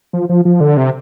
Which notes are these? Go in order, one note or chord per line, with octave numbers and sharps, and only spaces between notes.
F3
F3
F3
D3
C3